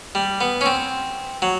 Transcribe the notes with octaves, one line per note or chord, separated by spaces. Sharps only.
G3
B3
C#4
C4
F#3